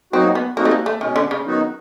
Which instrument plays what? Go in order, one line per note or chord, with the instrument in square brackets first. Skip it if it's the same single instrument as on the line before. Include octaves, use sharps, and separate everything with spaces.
[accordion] F#3 A#3 D#4 F#4 [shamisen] C4
[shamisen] B3
[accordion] G3 C4 D#4 F#4 [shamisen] A#3
[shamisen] A3
A#3
A3
[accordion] B2 G#3 C#4 [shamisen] D#3
[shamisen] D3
C#3
[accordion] D#3 F#3 B3 D#4 F#4